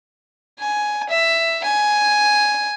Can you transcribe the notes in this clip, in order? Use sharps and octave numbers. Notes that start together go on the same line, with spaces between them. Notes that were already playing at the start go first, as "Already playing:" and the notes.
G#5
E5
G#5